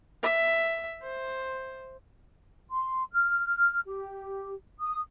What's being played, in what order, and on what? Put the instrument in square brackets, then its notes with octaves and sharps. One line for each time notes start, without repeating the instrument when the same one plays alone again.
[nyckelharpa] E5
C5
[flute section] C6
F6
G4
D#6